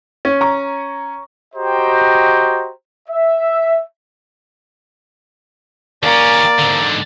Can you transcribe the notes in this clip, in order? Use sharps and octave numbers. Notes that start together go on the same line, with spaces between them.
C#4
A#5 C#6
F#4 G4 C5 D#5 G5 A#5
E5
D#2 A#3 C#4 D5
G#2 D3